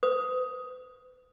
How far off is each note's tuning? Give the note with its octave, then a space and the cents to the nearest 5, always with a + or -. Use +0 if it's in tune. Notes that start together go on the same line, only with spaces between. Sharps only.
B4 +40 D#6 +10